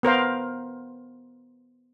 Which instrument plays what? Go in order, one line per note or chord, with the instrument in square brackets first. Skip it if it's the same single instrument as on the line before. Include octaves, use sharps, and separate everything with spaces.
[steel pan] B3 A#4 C5 F5